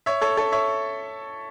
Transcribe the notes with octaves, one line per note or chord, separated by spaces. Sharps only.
C#5 E5
A4 C#5
A4 C#5
C#5 E5